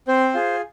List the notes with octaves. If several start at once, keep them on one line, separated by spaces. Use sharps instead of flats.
C4 C5
F4 G#4